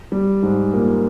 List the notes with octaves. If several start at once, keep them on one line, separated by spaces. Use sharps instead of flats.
G3
G#2 G#3
A#2 A#3